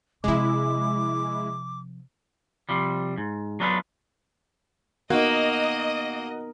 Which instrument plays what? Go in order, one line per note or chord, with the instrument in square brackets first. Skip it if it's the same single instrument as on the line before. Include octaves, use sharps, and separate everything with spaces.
[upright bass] C3 F3 [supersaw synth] G#3 E4 [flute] D6
[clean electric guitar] C3 F3 G3
G#2
F#3 B3 D4 F4 A4 B4
[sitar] A#3 [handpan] B3 D#4 [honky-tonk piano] F#4 A#4 [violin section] D#5